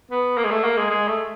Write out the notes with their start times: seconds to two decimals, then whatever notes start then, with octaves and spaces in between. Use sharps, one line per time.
0.11 B3
0.37 A#3
0.45 G#3
0.51 A3
0.64 A#3
0.77 G#3
0.90 G#3
1.08 A3